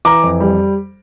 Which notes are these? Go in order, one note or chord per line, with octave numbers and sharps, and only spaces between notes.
E3 A#5 D6
F2
G3